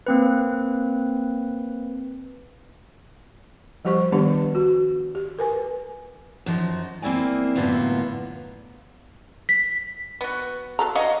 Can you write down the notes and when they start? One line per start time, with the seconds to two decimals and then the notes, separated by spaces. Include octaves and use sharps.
0.07 A#3 C4 B4
3.85 F3 G3 G4 C5 C#6
4.12 D#3 G3 B3 D4 G4 B4
4.55 F#4
5.15 G4
5.39 A#4 B4 G#5
6.46 F#2 F3 D#4
7.02 A#3 C4 E4 D5 G#5
7.55 F#2 A2 D3 A#3 B3 F4
9.49 B6
10.21 B3 F#4
10.79 F#3 A4 A#5
10.95 C#4 F#4 D#5 F5